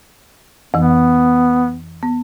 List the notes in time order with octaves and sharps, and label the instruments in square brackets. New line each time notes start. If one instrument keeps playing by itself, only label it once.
[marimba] F2 E3 [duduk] B3
[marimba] B3